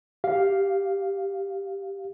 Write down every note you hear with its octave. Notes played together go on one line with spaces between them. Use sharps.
G4 F5